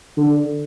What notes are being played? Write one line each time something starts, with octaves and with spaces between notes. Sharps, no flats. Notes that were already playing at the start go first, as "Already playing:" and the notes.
D3